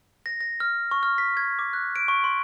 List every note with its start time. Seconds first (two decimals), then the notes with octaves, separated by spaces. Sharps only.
0.26 A#6
0.41 A#6
0.60 F6
0.91 C#6
1.03 F6
1.18 B6
1.37 G#6
1.59 D6
1.73 F#6
1.96 D7
2.08 C#6
2.24 C6